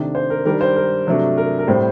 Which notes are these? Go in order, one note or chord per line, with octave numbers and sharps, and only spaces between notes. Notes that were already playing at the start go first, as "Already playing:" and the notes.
Already playing: C3 D#3 A3 D4
C5
A#4
D#3 G3 D4 A#4
C5
A#4
C3 F#3 A3 D4
A#4
A#4
A2 G3 C4 C5